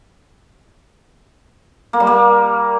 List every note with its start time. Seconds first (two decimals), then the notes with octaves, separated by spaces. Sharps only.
1.93 A#3
2.00 G3
2.07 A#3